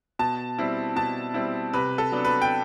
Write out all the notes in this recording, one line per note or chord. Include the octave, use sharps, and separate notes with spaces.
B2 A5
G3 C4 E4
B2 A5
G3 C4 E4
C3 B4
A4
F#3 B3 D4
B4
G5